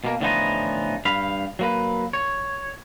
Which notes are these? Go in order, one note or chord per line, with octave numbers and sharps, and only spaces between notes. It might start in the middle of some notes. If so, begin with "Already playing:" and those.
B2 A#3
A2 D3 E3 F3 B3 D#4
G2 F5 B5
F#3 A#3 B4
C#5